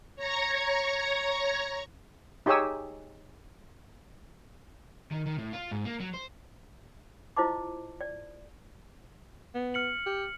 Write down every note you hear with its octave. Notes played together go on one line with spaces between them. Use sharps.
C#5 A#5 G#6 A#6 C#7
D#4 G4 G#4 C#5 G#5 E6
D#3
D#3
A2
F4
G#2
A#3
F#3
C5
E4 F4 C5 D#5 A5 D6
D5
B3
F6 C#7 F#7
G4